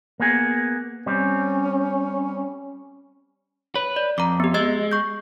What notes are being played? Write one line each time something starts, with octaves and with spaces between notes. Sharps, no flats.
A#3 B3 G#4
G3 C4 C#4
B4 C#5
D5
F2 A#5 D6
B3 G4
G#3 D#5 E6 A6
C#6 G6